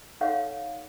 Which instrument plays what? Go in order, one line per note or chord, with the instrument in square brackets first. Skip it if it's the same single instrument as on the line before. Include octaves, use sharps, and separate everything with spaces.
[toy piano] D#4 A4 C#5 F5 F#5